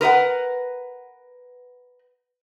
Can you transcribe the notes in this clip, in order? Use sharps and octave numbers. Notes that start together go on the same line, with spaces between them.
A#4 B4 D#5 F#5